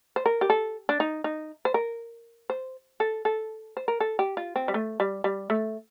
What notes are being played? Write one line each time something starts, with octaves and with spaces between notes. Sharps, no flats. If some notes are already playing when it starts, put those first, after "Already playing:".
C5
A#4
G4
A4
D4
D#4
D#4
C5
A#4
C5
A4
A4
C5
A#4
A4
G4
F4
C4
G3
A3
G3
G3
A3